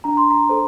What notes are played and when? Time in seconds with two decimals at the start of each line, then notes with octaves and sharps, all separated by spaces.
0.04 D4 A#5
0.17 C6
0.31 A#5
0.49 A4 C5